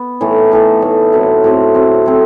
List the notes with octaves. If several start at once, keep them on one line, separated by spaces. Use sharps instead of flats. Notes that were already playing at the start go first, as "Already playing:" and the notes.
Already playing: B3
A2 E3 A3 D#4
A2 E3 A3 D#4
A2 E3 A3 D#4
A2 F#3 C4
A2 F#3 C4
A2 F#3 C4
A2 F#3 C4